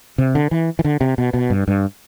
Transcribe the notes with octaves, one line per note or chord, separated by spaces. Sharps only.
C3
D3
E3
E3
D3
C3
B2
B2
G2
G2